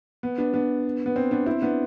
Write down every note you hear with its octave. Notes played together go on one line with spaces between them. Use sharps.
B3
B3 D4
B3 D4
B3
C4
B3 D4
C4 E4
B3 D4